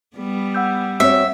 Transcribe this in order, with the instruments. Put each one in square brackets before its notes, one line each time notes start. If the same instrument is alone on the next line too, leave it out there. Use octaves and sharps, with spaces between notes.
[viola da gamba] G3 B3
[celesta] F#5 E6 G6
[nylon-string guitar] C4 F#4 C#5 [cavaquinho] E5